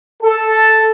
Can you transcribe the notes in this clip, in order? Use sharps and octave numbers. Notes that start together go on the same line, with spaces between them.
A4